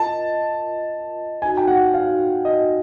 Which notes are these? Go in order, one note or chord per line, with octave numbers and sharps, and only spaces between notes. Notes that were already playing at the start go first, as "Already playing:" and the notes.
Already playing: F4 A#4 D#5 A5
D#4 F#4 A4 G#5
G5
F#5
F5
D#5